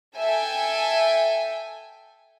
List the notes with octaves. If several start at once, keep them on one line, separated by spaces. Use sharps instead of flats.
A4 E5 G5 G#5